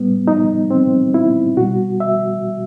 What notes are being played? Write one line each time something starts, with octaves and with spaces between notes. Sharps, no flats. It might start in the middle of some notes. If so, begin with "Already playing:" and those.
Already playing: A2 G3 B3
D#4
C4
E4
B2 G3 F#4
E5